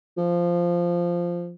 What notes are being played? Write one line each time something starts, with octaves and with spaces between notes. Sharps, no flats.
F3